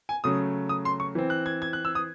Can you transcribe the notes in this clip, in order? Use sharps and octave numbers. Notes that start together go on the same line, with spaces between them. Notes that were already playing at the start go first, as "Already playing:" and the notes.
G#5
C#3 F#3 A3 D#6
D#6
C6
C#6
E3 C4
F#6
G#6
G#6
F#6
E6
D#6